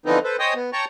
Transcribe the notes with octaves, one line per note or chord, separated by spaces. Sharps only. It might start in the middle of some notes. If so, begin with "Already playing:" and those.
D3 E3 F3 B3 C4 D#4
A4 B4 C5
C5 C#5 D#5 G5 G#5 D#6
B3
C#5 G5 A5 A#5 C#6